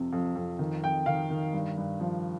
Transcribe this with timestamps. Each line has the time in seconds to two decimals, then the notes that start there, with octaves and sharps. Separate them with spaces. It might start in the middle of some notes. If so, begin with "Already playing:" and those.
Already playing: F2 C3
0.13 F2
0.36 F2
0.59 D#3
0.82 F2 G5
1.06 D#3 F5
1.30 D#3
1.53 G2
1.78 G2
2.00 F3